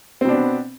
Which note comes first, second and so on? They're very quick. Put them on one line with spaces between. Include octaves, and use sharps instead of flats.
C4 B2 D4 B3